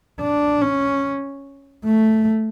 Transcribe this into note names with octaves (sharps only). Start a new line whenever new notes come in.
D4
C#4
A3